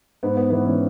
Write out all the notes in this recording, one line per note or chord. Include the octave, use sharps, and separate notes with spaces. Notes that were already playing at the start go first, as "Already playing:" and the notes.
G#2 B3
B3
E3 B3
C#4